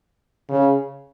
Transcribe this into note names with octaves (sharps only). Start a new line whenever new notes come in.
C#3